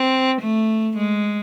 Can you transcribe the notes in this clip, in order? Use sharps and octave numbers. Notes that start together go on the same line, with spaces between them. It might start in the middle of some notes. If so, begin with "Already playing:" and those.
Already playing: C4
A3
G#3